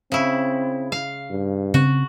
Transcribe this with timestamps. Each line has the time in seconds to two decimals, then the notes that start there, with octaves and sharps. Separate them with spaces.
0.12 C#3 C4 E4
0.92 F5
1.31 G2
1.74 C#3 C4 F#4